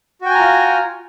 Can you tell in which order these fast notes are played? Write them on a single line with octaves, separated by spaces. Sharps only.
F#4 G5 G#5 A#5 F4